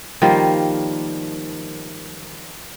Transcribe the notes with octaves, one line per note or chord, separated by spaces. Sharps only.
D#3 F3 G3 A#3